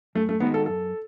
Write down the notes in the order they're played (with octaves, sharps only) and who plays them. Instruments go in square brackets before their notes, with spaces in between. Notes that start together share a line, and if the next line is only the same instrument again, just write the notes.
[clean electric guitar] F#2 [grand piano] A3
[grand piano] A3
[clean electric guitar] D#3 G#3 D#4 F#4 [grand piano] B3
[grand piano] A4
[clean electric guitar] F#2 [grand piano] A4